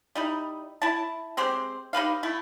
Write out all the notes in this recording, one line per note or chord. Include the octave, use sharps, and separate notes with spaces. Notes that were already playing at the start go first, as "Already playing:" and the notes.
G3 D#4 E4
E4 A5
G#3 C4 G4 C5
D#4 G4 B4 F5
A3 E4